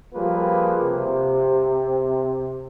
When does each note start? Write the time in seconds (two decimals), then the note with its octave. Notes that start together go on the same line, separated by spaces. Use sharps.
0.14 F3 G3 A#3 F4 G#4 B4
0.84 C3